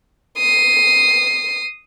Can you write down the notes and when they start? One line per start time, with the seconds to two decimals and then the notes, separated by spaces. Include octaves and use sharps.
0.38 D#6 C7